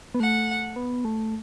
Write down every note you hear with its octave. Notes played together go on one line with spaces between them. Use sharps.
B3
A3 F#5
B3
A3